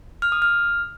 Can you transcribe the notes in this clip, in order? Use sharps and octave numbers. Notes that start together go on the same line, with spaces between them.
F6
D#6
F6